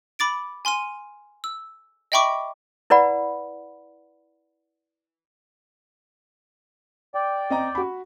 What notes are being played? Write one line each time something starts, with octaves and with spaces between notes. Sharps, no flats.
B5 D6 A6 D7
G#5 C6 F6 D#7
E6
D#5 E5 G5 B5 C#6 D6
E4 B4 D5 F#5 B5
D5 G5
C4 D#5 A#5
F#4 B5